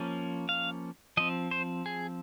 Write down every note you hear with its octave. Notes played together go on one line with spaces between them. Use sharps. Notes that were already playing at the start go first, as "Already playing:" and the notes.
Already playing: F3 A#3 C#4
F5
F3 C4 D#5
C5
G#4